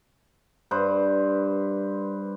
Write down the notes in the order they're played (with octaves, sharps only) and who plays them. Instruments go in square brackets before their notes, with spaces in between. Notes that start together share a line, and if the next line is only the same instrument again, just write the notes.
[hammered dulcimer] G2 B4 C5